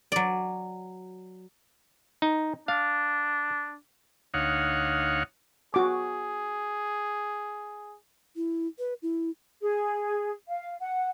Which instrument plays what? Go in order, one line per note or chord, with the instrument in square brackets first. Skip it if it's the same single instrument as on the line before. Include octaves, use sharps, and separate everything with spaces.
[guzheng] F#3 D5
[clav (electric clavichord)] D#4
[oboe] D4 [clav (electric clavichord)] F5
[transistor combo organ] D2 D#4 C#5 F5 F#5
[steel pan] F#4 D6 [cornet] G#4
[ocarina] E4
B4
E4
[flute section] G#4
F5
F#5